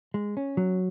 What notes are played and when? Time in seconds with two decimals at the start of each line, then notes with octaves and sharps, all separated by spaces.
0.14 G#3
0.37 C#4
0.57 F#3